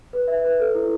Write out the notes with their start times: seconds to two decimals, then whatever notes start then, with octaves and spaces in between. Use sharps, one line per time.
0.13 B4
0.28 E5
0.44 B4
0.60 A4
0.75 E4